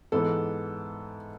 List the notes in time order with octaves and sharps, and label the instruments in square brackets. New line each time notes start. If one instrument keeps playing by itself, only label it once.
[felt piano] G#2 E3 B3 A4